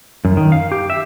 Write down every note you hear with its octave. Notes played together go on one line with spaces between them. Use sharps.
F#2
D#3
F5
G4
E5